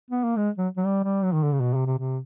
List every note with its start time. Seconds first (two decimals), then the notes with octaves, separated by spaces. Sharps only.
0.11 B3
0.23 A#3
0.37 G#3
0.58 F#3
0.77 F#3
0.85 G3
1.04 G3
1.24 F#3
1.33 D#3
1.43 D3
1.52 C#3
1.60 B2
1.74 C3
1.86 C3
1.98 C3